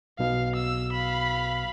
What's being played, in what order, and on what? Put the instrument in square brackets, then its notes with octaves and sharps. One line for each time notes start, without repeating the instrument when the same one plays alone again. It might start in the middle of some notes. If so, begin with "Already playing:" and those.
[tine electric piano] B1 B2 [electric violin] F5
[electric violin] E6
F5 B5